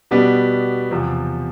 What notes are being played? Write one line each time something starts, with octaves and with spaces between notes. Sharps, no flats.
B2 G3 B3 D4
E2 C3 F3